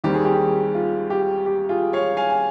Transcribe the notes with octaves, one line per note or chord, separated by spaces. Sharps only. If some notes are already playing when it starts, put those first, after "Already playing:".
D#2 D#3 G3 C4 G4
G#4
G4
F4
G4
G4
F4 G#4
C#5 F5
F5 G#5
G#5